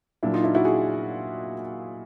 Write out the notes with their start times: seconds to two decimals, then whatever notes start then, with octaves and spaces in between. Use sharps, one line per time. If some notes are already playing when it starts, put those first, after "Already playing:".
0.23 A#2 F#3 D4 E4
0.34 D#4 F4
0.44 D4 E4
0.55 E4 F#4
0.65 F#4 G#4